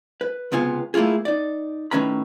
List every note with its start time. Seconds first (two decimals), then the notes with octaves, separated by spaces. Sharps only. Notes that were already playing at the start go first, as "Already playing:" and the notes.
0.21 B4
0.52 C#2 C3 B3 F4 G#5
0.94 A3 A#3 E4 F4 G#4
1.25 D#4 D5
1.91 A2 D#3 C#4 B4 A#5 B5